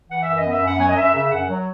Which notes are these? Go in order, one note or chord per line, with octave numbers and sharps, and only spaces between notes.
E3 F#5
F#2 E5
D#5
B3
E5
F#2
F#5
F#3 G#5
D#5
F#2 E5
C#3 E5
F#2 F#5
F#3